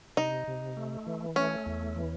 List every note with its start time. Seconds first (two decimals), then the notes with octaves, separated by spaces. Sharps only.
0.17 C3 D#4
0.47 C3
0.77 A3
1.06 E3
1.36 A3 C#4
1.66 E2
1.96 E3